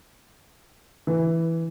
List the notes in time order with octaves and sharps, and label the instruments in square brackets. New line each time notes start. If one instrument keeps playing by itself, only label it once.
[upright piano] E3